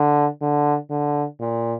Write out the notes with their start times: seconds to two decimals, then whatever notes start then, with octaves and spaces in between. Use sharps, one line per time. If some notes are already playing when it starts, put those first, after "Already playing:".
Already playing: D3
0.41 D3
0.90 D3
1.40 A#2